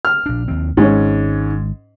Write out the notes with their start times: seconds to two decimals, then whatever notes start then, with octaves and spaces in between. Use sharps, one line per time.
0.05 F6
0.26 A#1 D4
0.48 D#2 C4
0.77 G#1 G#2 C#4